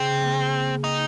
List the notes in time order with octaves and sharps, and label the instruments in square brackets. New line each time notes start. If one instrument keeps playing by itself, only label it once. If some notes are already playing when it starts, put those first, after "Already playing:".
Already playing: [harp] C#3 [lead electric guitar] C4
[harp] A#3
[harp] C4 [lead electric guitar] D#4